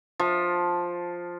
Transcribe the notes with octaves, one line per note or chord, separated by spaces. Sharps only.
F3